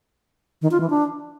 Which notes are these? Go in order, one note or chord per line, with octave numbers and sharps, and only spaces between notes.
D#3
F4
E3
D4